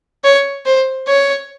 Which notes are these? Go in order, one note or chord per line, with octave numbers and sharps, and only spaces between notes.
C#5
C5
C#5